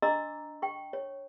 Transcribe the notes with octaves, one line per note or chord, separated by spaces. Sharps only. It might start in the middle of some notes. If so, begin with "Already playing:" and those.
D4 D#5 A#5 C6 D6 E6
G5 C#6
C#5